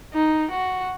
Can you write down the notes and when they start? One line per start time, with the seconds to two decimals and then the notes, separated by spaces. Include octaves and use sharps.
0.13 D#4
0.50 F#4